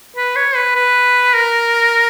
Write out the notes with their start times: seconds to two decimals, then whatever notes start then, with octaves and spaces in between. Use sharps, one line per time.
0.17 B4
0.36 C#5
0.55 B4
0.76 B4
1.35 A#4